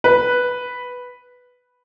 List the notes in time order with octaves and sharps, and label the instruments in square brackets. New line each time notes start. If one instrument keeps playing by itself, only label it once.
[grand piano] B4